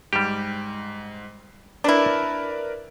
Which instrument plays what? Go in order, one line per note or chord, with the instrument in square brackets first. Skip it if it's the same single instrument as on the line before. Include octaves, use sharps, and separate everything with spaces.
[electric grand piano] G#2 [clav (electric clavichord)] G3 G4
[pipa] D4 E4 [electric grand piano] A#4 B4 D5